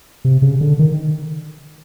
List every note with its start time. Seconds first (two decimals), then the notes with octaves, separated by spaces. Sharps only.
0.25 C3
0.42 C#3
0.61 D3
0.79 D#3